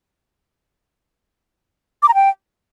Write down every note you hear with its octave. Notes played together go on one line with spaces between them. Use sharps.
D6
A#5
G5